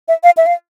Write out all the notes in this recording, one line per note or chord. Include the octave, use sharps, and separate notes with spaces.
E5
F5
E5
F5